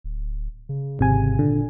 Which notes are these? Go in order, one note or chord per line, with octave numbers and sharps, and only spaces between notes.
D1
C#3
G#1 C3 G#5
A#2 D3